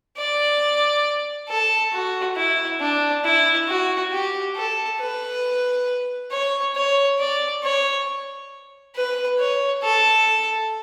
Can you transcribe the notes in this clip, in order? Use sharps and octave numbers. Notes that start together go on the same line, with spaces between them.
D5
A4
F#4
E4
D4
E4
F#4
G4
A4
B4
C#5
C#5
D5
C#5
B4
C#5
A4